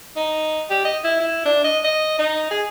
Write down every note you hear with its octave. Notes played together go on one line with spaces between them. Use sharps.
D#4
G4
D#5
E4
E4
D4
D#5
D#5
D#4
G#4